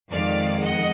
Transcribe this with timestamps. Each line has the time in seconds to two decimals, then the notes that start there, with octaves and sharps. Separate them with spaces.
0.11 F2 D#3 G#3 D5 F5
0.62 D#5 F#5